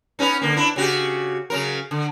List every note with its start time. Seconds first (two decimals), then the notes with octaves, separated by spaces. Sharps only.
0.19 B3 C#4 D#4
0.42 D3 A#3
0.56 D4 E4
0.76 C#3 F#4 G4
1.50 C#3 F#3 A#4
1.91 D3